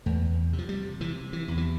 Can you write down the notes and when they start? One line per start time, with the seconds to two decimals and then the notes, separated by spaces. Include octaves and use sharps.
0.06 E2 A3
0.53 C3
0.58 F3
0.69 G3
1.00 C3 E3
1.33 E3
1.48 E2
1.58 E3